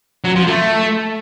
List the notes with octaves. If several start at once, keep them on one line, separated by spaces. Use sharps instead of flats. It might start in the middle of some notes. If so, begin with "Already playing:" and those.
F#3
F3
A3